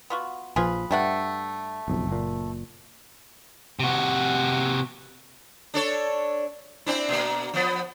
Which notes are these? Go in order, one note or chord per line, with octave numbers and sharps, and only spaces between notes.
B3 F4 F#4
A#1 F3 F4 G#4 B4
G2 G3 A3 F#5
F#1 B1 F2
F#1 A#2
C3 F#4
D4 A4 C#5
C4 D4 E4
B2 A#3
F3 B3